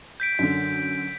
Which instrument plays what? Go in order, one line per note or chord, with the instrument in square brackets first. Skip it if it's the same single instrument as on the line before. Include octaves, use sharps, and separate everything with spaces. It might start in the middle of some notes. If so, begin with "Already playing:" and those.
[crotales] G6 B6 D7
[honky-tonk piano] F#2 D3 [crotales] B6